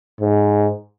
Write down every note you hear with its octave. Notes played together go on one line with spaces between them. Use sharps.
G#2